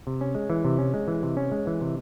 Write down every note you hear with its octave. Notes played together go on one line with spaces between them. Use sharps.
C3
C#4
G#3
E3
C3
C#4
G#3
E3
C3
C#4
G#3
E3
C3